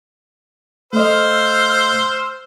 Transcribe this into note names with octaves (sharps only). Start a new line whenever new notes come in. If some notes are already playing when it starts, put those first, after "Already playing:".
A3 C5 D#5 F5 E6 F6